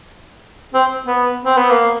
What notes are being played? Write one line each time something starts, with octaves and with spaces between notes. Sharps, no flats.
C4
B3
C4
B3
A#3